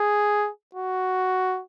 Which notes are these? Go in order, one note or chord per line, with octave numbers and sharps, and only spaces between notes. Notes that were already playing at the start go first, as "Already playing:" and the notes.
Already playing: G#4
F#4